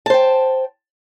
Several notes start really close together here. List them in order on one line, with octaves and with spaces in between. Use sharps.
A5 C5 G5